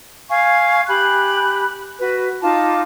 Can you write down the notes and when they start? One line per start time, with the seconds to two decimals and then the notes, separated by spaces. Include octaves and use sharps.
0.28 F5 G#5 C#6
0.87 G4 G#5 B5 F#6
1.99 F#4 B4
2.43 D#4 F4 A5 D6